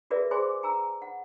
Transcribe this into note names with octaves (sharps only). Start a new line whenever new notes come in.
F#4 G#4 A#4 B4 D5 E5
G#4 C5 G#5 C6 D6
G#5 A#5 E6
F#5